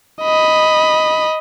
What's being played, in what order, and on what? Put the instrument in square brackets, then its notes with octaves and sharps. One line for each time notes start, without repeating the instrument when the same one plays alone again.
[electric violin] D#5 B5